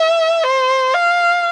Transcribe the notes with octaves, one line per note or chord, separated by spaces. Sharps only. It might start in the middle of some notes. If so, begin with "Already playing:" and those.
Already playing: E5
C5
F5